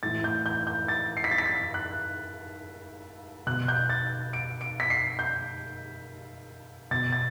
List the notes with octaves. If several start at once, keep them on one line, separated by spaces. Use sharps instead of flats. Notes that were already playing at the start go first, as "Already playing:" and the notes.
A2 E3 A6
G6
G6
G6
A6
C7
B6
A6
B6
A6
F#6
B2 F#6
G6
A6
D7
D7
B6
C7
G6
B2 A6
A6